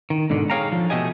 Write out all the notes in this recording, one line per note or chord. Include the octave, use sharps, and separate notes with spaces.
D#3
G#2 B2 D3
G#4 A4 C#5 F5 G5 A#5
D3 F3
B2 G#3 A3 G4 D#5 G#5